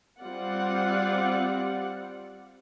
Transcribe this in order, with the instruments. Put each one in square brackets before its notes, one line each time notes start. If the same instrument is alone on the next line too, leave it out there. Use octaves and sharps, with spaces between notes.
[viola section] G3 C4 F4 D5 F#5